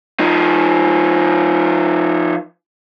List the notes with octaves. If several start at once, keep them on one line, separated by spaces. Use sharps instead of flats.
F3 D#4